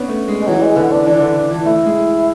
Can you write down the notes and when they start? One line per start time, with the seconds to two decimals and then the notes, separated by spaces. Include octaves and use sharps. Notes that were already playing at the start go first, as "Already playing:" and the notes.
Already playing: B3 C#4 D4
0.08 A3
0.28 G#3
0.41 G#3
0.47 E3 F#3
0.62 G#3
0.76 D3 B3
0.92 D4
1.07 E3 D4
1.21 D3
1.36 D3
1.51 E3
1.65 A3 E4
1.86 G#3